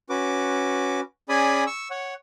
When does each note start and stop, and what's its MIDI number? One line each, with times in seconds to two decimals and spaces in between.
0.10 1.00 61
0.10 1.00 66
0.10 1.00 71
0.10 1.00 86
1.29 1.64 61
1.29 1.64 68
1.29 1.64 74
1.29 1.64 80
1.29 1.64 83
1.29 1.64 87
1.67 1.88 85
1.67 1.88 88
1.91 2.14 73
1.91 2.14 78